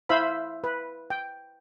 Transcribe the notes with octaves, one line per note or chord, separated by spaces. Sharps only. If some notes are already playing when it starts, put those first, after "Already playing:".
E4 C5 E5 F5 B5
B4
G5